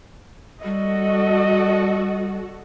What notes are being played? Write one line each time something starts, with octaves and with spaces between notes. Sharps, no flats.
G3 F#4 A4 D#5